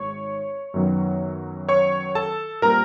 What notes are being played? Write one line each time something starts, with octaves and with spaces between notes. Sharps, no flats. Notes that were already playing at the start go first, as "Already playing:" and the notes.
Already playing: G#1 G#2 C#5 C#6
F#2 D#3 F#3 B3
C#5 C#6
A4 A5
A#2 G3 C4 A#4 A#5